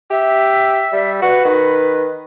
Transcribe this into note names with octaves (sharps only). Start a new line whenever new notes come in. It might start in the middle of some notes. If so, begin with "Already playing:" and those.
G4 E5
G3
F#4 B4
D#3